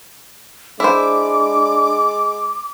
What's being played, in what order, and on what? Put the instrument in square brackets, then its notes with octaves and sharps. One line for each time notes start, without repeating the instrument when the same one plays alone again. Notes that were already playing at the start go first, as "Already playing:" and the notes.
[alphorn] G#3 [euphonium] D4 [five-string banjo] E4 C5 [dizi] D6